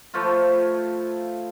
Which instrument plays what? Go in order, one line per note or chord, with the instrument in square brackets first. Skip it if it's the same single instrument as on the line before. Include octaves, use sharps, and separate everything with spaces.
[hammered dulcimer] F3 A3 E4 F4